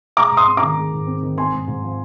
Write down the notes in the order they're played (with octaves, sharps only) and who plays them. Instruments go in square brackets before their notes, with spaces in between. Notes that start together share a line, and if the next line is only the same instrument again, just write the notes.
[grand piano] G#3 [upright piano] A#5 D6
[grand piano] G#2
[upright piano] C6 D#6
[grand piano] C4
[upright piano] A#5 D6
[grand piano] D#3
G#3
G#2
C4
D#3
[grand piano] C4 [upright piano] G#5 C6
[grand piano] G#2
G#2
F3